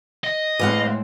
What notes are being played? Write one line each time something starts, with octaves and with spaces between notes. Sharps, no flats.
D#5
A2 E3 G#3 C4 F5 F#5